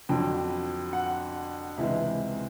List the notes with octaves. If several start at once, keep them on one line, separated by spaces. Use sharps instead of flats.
F2 D3 F#3 G5
F#5
C#2 C3 E3 G#3 E5